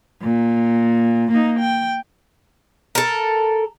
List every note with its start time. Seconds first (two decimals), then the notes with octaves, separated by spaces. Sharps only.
0.23 A#2
1.31 A#3 D#4
1.60 G5
2.95 A4 A#4